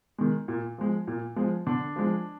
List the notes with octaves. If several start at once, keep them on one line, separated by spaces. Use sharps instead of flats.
D#3 G#3
A#2
F3 G#3
A#2
F3 G#3
D3 D4
F3 G#3